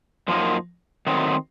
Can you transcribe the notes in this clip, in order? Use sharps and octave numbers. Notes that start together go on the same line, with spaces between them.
F#2 F3 A#3 D#4
D#3 F#3 A3 C4 D#4